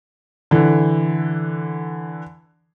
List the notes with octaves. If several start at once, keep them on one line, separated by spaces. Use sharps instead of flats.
D3 E3